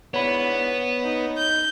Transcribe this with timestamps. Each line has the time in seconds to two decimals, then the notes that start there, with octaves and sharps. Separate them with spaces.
0.14 G#2 B3 D4 E4 C#5 B5
1.01 D#4
1.37 G6